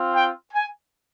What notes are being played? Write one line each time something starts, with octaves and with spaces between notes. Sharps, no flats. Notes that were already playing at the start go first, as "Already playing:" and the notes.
Already playing: C4 F4
G5
G#5